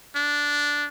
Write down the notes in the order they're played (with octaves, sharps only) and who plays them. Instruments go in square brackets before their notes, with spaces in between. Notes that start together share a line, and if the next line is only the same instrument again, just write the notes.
[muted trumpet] D4